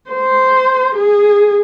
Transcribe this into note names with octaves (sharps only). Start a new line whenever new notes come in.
C5
G#4